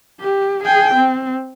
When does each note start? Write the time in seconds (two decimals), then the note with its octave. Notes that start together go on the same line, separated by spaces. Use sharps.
0.21 G4
0.63 G#4 G5
0.94 C4